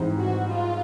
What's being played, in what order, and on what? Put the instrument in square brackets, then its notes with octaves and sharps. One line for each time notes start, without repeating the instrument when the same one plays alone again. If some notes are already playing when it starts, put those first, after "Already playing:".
Already playing: [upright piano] G#2 E3 G3 C4 D#4
[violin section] F#4
F4